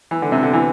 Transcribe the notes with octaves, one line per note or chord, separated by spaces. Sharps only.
E3
D3
C3
D3
E3